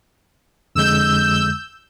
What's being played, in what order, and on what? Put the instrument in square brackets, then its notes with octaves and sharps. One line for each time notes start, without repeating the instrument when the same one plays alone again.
[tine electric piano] F2 D3 G#3 [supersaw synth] E6 G6